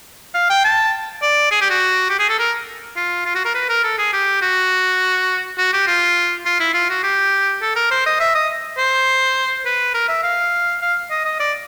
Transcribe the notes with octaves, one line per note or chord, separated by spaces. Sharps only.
F5
G5
A5
D5
G#4
G4
F#4
G4
G#4
A4
A#4
F4
F4
F#4
A#4
B4
A#4
A4
G#4
G4
F#4
F#4
G4
F4
F4
E4
F4
F#4
G4
A4
A#4
C5
D#5
E5
D#5
C5
B4
A#4
E5
F5
F5
D#5
D#5
D5